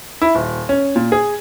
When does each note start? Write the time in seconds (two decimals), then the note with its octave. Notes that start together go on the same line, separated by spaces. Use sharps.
0.22 E4
0.35 D#1
0.69 C#4
0.96 A#2
1.12 G#4